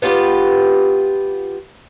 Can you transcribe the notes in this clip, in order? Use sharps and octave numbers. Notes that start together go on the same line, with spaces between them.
B3 F4 G4 B4